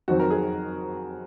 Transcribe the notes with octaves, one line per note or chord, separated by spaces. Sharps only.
F2 D#3 F#3 C4 F#4
A#4
G#4